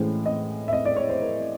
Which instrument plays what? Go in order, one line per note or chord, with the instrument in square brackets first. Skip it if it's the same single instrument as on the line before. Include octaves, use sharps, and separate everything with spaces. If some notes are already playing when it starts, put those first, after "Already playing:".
Already playing: [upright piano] A2 E3 G#3 C#4 C5
D#5
E5
D#5
D5
C#5
C5
A#4